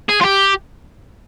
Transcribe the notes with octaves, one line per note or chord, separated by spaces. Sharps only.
G#4
F4
G4